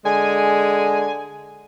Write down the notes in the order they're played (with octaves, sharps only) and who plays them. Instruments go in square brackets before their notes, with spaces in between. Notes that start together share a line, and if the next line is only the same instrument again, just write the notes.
[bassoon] D3 [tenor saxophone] G#3 [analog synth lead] G#5